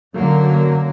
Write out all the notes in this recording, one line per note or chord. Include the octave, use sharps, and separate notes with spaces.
F#2 D3 F#3 A#3